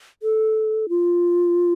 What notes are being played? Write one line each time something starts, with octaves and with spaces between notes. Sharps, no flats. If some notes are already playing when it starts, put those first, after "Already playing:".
A4
F4